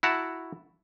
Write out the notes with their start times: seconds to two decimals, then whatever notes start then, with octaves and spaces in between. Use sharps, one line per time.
0.03 E4 F#4 F#5 A5 A#5